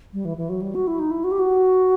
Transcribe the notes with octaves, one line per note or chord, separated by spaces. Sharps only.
G3
E3
E3
F#3
G3
F#4
E4
D#4
E4
F#4
G4
F#4